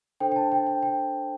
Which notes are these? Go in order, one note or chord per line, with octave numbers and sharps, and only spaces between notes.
D4 A4 C5 G5
G5
A5
G5
G5
G5